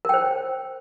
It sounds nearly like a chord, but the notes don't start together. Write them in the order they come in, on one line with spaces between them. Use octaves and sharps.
A#4 G5 C5